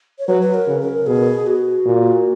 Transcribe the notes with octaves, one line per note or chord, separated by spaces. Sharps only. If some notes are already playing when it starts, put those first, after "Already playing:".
C#5
F#3 B4
B4
A#4
C#3
A#4
B2 G#4
F#4
A#2